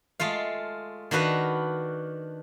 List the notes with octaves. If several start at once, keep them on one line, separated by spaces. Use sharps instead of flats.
G#3 A3 F4 F5
D#3 D4 F#4 B4 F5